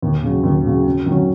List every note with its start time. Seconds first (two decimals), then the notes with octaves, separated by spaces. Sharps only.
0.02 D#2
0.23 C#3 F#3
0.43 D#2
0.65 C#3 F#3
0.86 F#2
1.06 D#3 F#3 C#4